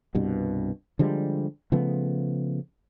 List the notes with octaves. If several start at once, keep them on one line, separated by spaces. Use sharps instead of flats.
C2 G2 B2
D3 F3 G3 G#3
C#3 F3 A3 B3